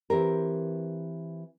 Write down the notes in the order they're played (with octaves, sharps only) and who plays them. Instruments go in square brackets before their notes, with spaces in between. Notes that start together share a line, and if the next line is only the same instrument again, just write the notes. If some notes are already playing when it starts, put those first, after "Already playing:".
[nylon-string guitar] E3 C4 G4 A#4